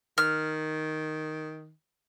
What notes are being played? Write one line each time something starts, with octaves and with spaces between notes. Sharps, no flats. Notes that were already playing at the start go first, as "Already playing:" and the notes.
D#3 F6